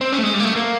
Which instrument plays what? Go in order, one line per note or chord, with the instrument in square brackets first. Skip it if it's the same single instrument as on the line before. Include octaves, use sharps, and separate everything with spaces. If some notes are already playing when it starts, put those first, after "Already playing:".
[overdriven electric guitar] C4
C#4
A3
G#3
G3
A#3
A3
A#3